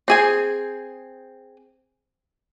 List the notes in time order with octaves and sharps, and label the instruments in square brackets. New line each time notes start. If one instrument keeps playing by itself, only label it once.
[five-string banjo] C4 G#4 G#5